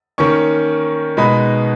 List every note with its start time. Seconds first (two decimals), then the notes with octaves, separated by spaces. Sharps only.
0.18 D#3 A#3 C#4 C#6
1.17 B2 G#3 D#4 B5